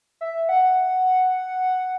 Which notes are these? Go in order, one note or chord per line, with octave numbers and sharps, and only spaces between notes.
E5
F#5